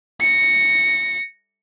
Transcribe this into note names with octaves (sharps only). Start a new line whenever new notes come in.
A#6 C#7